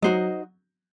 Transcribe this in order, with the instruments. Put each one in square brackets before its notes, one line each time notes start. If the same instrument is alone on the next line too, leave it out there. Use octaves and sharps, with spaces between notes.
[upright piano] F#3 [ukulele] D#4 F#4 C5 D#5